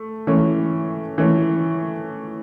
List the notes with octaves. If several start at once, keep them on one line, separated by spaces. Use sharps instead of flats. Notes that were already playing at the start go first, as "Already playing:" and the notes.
Already playing: A3
E3 A3 C#4
E3 A3 C#4